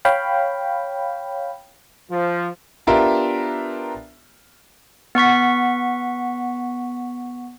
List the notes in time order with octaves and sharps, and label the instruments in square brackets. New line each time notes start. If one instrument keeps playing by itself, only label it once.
[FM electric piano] C#5 F5 G5 B5
[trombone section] F3
[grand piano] B3 D4 F4 G4 A#4 E5
[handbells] B3 F#5 C#6 B6